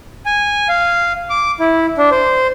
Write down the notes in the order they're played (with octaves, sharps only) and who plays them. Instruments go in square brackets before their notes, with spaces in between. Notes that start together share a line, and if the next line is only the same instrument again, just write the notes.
[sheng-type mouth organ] G#5
F5
D6
E4
D4
C5